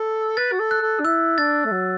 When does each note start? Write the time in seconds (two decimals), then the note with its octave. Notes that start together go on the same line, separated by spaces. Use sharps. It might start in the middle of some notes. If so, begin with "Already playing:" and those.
Already playing: A4
0.37 B4 A6
0.52 F#4
0.59 A4
0.71 F#6
0.81 A4
0.99 D4
1.05 E4 E6
1.38 D4 A6
1.65 A3
1.71 F#3